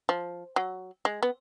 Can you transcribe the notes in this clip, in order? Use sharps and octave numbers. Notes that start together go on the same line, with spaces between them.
F3
F#3
G#3
B3